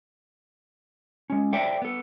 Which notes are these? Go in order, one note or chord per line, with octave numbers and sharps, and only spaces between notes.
G#3 C#4
A4 C5 D5 E5 G5
B3 A4